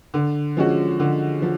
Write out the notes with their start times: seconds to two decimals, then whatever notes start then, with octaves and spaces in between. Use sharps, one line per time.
0.14 D3
0.57 F3 G#3 C#4 F#4
1.00 D3
1.42 F3